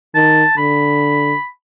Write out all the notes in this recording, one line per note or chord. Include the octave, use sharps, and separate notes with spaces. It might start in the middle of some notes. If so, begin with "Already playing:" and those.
D#3 A5
D3 B5